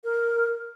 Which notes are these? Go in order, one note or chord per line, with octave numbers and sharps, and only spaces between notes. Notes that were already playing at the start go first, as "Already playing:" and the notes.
A#4